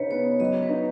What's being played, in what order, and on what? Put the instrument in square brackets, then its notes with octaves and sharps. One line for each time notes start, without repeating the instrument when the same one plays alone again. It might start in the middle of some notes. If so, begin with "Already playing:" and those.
Already playing: [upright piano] C#3 D#4 [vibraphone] B4 C#5
[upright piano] B3 [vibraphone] C#5
[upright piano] F#3 [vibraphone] D#5
[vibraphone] B4
[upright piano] D#4